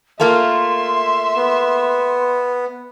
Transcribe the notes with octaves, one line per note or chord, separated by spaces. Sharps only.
A3 A#3 F4 E5 C6
B3